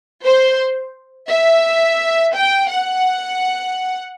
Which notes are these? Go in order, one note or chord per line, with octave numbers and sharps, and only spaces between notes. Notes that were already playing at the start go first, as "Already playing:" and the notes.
C5
E5
G5
F#5